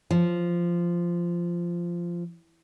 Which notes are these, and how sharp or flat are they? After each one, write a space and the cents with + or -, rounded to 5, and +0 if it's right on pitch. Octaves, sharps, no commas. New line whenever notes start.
F3 -10